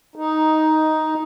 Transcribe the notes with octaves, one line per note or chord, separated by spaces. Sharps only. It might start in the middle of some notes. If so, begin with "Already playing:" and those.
D#4